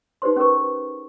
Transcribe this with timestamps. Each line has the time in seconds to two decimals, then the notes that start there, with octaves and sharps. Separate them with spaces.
0.22 D#4 G4 B4 C5 C6
0.36 C#4 G4 G#4 A#4 B4 C#6